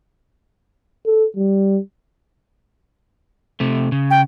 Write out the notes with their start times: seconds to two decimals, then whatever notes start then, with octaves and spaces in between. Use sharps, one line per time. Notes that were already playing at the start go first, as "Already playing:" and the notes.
1.06 A4
1.37 G3
3.60 C3 A3
3.92 C#3
4.11 G5